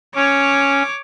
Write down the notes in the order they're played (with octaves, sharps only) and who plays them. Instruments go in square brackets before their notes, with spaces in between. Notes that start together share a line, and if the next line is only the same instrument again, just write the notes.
[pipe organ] C#4 [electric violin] C#5 D6